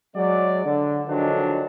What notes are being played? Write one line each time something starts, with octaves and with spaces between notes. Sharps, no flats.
F#3 G#3 D5
D3
D3 D#3 F3 F#3 G#3 D4